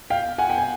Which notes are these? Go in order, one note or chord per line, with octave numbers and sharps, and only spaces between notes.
F5 G5
F#5 G#5
G5
G#5